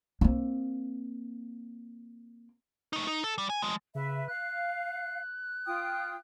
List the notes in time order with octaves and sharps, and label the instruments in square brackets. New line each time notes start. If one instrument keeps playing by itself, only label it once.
[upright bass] A#3 C4
[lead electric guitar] A3 D#4
D#4
A4
G3
G#5
F3 G#3
[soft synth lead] C#3 [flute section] B4 E5
[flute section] F5 [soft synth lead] F#6
[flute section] F4 G5 D#6